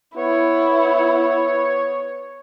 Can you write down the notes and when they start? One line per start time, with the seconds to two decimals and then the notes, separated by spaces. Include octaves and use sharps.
0.16 B3 E4 C#5